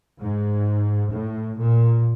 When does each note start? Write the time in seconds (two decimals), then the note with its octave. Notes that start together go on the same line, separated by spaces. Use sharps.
0.20 G#2
1.12 A2
1.58 A#2